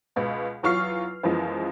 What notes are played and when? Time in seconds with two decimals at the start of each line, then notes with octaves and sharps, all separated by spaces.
0.16 C#2 B2
0.63 E2 F#3 F4 C#6 F6 C7
1.23 F#2 E3 F3 G#3 B3